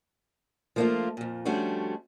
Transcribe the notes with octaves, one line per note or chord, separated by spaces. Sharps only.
F3 A3 A#3 C#4 D4 F4
F2 A#2
F3 G3 A3 C#4 D4 F#4